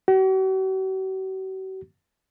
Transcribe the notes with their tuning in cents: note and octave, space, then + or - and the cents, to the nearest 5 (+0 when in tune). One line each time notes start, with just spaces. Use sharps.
F#4 +45